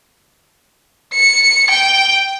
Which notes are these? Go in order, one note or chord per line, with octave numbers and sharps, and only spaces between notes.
C#7
G5